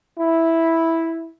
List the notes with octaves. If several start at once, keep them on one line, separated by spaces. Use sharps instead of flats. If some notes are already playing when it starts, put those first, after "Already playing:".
E4